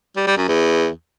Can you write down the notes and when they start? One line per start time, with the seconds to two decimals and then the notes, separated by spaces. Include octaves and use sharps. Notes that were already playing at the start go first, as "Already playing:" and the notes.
0.16 G3
0.27 G3
0.37 F#2
0.48 E2